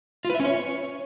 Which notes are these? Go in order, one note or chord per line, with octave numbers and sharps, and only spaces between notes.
F4
B4
E5
C#4
C#5